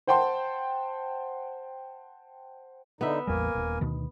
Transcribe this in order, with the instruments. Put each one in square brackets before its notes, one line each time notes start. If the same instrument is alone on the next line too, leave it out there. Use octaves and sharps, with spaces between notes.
[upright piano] C5 F#5 G5 A5 C6
[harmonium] D3 D#4 [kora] B3 E5
[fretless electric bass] A1 E2 G3 [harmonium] A#3 A#4 G#5
[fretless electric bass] D#1
D2 B2 D#3